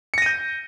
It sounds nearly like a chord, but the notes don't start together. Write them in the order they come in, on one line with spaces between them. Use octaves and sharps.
C#7 A#6 D#7 G6